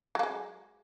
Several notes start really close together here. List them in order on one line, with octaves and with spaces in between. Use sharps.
F#3 A#3 G#3